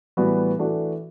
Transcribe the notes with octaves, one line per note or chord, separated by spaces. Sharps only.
A2 E3 G3 B3 F#4
E3 A3 D4 F#4